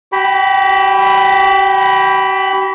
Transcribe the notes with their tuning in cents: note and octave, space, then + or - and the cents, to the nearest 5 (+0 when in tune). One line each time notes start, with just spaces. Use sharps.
G4 -45 G5 +15 B5 +0